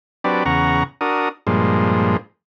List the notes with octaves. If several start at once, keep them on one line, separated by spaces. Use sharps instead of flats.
F#3 C4 D4 G4 B4 D5
E2 C#3 F#5 A#5 C#6
D4 F#4 A#4 D#6
G2 A#2 F3 G#3